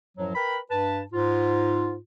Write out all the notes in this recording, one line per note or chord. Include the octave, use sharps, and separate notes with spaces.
F#2 A2 F3 F#3
A#4 B4 G5 B5
G2 B4 A5
G#2 F4